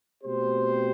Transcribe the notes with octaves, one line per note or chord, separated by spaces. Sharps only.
B2 A3 C4 G4 C5